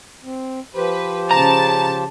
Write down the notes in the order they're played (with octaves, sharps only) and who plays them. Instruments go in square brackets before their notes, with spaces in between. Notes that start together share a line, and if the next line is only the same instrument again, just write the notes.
[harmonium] C4
[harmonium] F3 G4 C5 [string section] B4
[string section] C#3 A5 [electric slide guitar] A#5